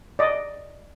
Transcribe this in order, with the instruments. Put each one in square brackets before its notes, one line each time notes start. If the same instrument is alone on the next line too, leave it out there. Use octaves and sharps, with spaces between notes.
[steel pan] D5 D#5